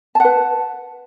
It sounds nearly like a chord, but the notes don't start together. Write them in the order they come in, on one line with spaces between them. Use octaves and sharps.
A5 F#5 B4